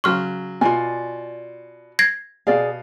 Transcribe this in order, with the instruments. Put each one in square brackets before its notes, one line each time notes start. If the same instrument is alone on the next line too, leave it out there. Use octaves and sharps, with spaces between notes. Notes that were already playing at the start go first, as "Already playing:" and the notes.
[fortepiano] C#3 F#3 C6 [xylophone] C#6 F6
[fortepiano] B2 [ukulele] F4 D5 G#5
[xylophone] G#6 A#6 C7
[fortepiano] B2 F5 [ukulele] G#4 D5